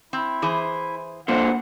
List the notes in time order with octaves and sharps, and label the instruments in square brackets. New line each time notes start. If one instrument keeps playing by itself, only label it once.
[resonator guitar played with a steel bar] C4 [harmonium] E4
[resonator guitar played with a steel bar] E3 G#4 C5
[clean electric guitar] D3 A#3 C5 [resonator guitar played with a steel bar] F4 [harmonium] F#5